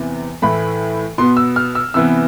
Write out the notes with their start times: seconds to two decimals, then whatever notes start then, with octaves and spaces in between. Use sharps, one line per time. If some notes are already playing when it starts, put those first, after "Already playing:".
Already playing: E2 C3 E3
0.42 A2 E3 A3 B5
1.18 B2 B3 C6
1.37 E6
1.56 F6
1.75 E6
1.94 C3 E3 B3 E6